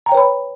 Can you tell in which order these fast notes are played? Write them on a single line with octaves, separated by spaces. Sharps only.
A#5 G5 C#5 B4 B5